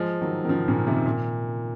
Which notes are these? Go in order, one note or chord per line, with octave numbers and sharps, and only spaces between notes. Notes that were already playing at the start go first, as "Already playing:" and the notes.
Already playing: F3 G#3
D#3 F#3
D#3
C#3 F3
A#2 C#3
C3 D#3
A#2